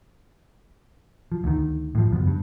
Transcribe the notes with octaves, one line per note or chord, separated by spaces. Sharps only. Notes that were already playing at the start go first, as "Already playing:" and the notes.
F3
D2 D#3
A2 F3
F#2 C#3 F3 B3
G2